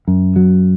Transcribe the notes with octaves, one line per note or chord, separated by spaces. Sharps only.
F#2
F#3